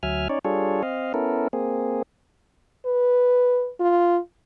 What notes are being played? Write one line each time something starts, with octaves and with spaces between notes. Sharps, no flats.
D2 F#3 E5 G#5 F6
C#4 D#4 C#5 D5
G3 D4 F4 G#4 A4 C#5
C4 D#5 F5
B3 C#4 E4 A4 A#4
A#3 C4 G#4
B4
F4